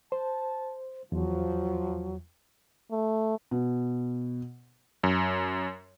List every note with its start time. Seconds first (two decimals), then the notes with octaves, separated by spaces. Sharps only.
0.12 C5 A5
1.12 E2 F3 F#3
2.91 A3
3.51 B2
5.04 F#2